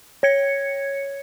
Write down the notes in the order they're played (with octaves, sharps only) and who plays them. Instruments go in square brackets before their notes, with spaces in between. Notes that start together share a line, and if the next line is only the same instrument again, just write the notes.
[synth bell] C#5 G#6 C#7